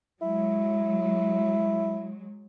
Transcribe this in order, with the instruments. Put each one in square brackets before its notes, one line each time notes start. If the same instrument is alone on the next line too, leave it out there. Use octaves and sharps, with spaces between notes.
[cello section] F#3 G#3 [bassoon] E4